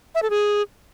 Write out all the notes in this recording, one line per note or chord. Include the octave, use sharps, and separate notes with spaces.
E5
A4
G#4